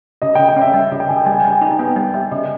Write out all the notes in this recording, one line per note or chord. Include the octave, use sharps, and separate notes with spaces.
C#3 D#5
C#3 G5
G5
C#4
E5
G3 E5
C#3
G5
C#3 G#5
G5
G3 G#5
G5
G#5
G3 G5
G#5
D#4 G5
B3 G5
G3 G5
G3 E5
C#3 D#5